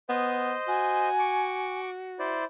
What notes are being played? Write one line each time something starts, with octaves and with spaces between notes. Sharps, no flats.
B3 C5 D#5
F#4 G#5
C#6 D6
E4 C5 D5